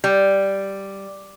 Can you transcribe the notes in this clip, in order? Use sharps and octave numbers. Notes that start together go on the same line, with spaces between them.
G3